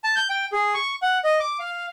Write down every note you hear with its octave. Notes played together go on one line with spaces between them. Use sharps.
A5
G6
G5
G#4
C#6
F#5
D#5
D6
F5